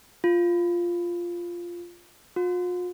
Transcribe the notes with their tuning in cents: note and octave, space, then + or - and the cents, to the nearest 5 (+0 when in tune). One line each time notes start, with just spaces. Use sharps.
F4 -5
F4 +45